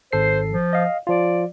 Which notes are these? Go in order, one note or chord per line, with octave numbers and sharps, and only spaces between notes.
G#1 A4 C5 C7
F3
D#5 F5
F3 F4 D5